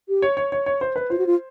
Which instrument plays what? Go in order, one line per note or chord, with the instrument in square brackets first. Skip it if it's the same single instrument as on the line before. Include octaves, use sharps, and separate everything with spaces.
[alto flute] G4
[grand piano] C#5
C#5
C#5
C#5
C5
B4
[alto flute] F4 [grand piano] C5
[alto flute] F#4
F4